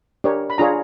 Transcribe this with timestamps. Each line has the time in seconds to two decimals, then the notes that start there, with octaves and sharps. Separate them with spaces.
0.24 D4 G4 A#4 C#5
0.50 B5
0.58 D4 F4 G#4 C#5 A#5